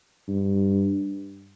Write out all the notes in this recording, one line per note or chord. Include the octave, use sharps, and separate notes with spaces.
G2